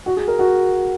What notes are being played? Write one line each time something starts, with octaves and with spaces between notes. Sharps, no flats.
F#4
G#4
A#4
F#4